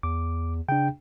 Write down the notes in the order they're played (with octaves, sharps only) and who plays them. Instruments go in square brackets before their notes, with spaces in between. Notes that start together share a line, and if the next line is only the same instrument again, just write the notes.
[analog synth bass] E2 [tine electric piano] D6
[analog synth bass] C#3 [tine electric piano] D4 G5